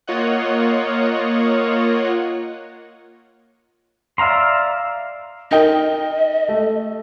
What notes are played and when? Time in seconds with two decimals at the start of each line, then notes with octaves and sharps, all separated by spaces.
0.07 A#3 F4 C#5 D#5 F#5
4.18 D5 E5 F5 A#5 C6
5.51 D#4 A#4 D#5 G5
6.49 A3